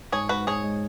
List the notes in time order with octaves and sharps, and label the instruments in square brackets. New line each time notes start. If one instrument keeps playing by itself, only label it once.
[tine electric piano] G#2 [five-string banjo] G#4 C#5
[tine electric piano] G#2 [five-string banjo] F#4 B4
[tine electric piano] G#2 [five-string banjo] G#4 C#5
[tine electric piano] G#3